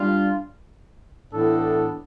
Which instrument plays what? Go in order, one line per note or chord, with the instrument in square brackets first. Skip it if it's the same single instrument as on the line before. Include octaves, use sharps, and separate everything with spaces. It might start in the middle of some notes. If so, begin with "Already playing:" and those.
Already playing: [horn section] G3 D4 F4
A2 E3 B3 D4 A4